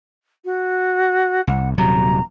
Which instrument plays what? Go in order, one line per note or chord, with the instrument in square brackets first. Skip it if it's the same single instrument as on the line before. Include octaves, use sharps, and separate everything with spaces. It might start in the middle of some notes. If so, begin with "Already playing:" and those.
[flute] F#4
[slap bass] C2 [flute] F#5
[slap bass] D#1 C3 F#3 [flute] A#5